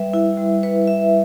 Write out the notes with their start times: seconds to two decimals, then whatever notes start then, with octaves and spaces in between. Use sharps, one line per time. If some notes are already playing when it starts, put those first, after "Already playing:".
Already playing: G3 B4 E5
0.14 E4
0.38 G3
0.63 B4
0.87 E5